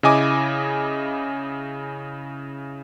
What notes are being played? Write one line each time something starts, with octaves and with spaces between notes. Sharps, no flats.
C#3 E4 D#5 G#5 D6